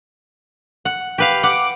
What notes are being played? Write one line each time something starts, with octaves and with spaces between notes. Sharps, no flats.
F#5
G4 B4 F5
F#5 D6